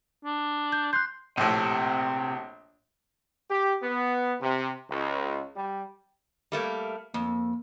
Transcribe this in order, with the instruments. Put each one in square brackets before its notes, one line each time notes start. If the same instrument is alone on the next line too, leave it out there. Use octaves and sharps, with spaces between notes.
[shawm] D4
[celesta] G6
[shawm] C6 [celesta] F#6 G6
[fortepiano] A#1 A2 [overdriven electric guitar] C3
[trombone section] G4
B3
C3
C#2
G3
[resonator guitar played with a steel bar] G3 A3 A#3
[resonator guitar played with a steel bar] F2 [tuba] A#3